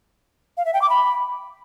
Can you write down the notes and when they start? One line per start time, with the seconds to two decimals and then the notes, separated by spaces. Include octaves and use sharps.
0.57 F5
0.65 E5
0.73 G5
0.82 D6
0.90 B5